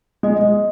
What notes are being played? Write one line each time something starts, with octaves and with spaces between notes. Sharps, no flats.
G#3 D#5